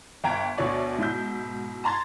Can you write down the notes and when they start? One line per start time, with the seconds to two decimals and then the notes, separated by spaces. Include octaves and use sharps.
0.24 G1 G5 A#5 G#6 D7
0.57 D2 B2 D3 C#5 D5 C#6
0.98 G#2 B2 E4 G6
1.84 A5 A#5 C6 G#6 A6